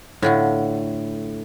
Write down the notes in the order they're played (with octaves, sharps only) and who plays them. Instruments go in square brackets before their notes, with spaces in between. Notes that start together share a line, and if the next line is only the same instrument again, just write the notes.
[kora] A2 [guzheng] D3 F4 F#4